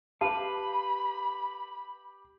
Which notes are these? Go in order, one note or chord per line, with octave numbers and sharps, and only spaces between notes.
G4 B4 F5 A5 B5